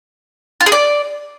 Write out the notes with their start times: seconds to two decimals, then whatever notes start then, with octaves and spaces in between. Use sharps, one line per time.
0.61 F4
0.66 G#4
0.72 D5